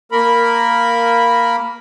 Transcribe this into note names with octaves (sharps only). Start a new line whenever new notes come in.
A#3 A#4 B5